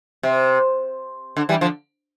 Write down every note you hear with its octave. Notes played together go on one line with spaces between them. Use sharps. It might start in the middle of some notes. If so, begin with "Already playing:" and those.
C3
D3
E3 G3
D3 F3